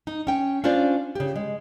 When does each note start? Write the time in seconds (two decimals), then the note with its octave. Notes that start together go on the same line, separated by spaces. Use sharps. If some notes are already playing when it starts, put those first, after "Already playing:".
0.07 D#4
0.27 C#4 G5
0.64 C#4 D4 F4 C5 D5
1.15 C#3 G4
1.36 G#3